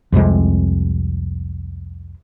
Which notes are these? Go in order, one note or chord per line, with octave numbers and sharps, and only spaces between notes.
C2 F2 C3 G#3